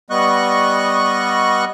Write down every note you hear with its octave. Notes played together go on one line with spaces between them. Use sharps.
G3 B3 D#5 C#6 F#6